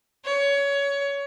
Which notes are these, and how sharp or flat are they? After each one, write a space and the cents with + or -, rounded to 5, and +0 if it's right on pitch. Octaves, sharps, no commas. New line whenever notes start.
C#5 +20